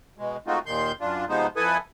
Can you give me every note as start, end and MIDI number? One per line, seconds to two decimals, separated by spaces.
0.18 0.37 47
0.18 0.37 56
0.47 0.59 56
0.47 0.59 57
0.47 0.59 60
0.47 0.59 63
0.47 0.59 65
0.47 0.59 66
0.66 0.92 39
0.66 0.92 46
0.66 0.92 51
0.66 0.92 84
0.66 0.92 91
1.01 1.25 42
1.01 1.25 62
1.01 1.25 65
1.29 1.47 48
1.29 1.47 53
1.29 1.47 56
1.29 1.47 59
1.29 1.47 63
1.29 1.47 72
1.56 1.77 41
1.56 1.77 64
1.56 1.77 69
1.56 1.77 71
1.56 1.77 80
1.56 1.77 87